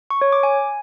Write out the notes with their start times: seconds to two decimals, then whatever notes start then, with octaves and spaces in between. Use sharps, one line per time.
0.11 C#6
0.21 C#5
0.32 D6
0.43 G#5